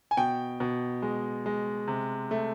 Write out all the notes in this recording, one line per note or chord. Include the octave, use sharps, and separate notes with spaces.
G#5
B2 G5
B2
G#3
G#3
C3
A3